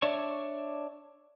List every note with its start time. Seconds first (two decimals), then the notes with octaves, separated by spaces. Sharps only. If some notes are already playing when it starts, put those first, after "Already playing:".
0.02 D4 C#5 D5 E5 C#6